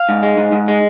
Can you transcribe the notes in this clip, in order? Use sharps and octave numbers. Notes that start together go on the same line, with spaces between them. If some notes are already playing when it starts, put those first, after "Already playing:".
Already playing: F5
G#2
G#3
G#2
G#2
G#3